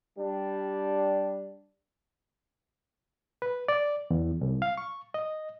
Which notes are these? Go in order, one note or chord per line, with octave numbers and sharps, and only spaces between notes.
G3 D4
B4
D5
E2
C2
F5
C#6
D#5